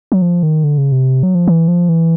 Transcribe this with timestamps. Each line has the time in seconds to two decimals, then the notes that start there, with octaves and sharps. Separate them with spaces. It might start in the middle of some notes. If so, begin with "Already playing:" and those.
0.12 F#3
0.22 F3
0.43 D#3
0.64 D3
0.78 C#3
0.92 C3
1.23 F#3
1.35 F3
1.48 E3
1.68 F3
1.89 E3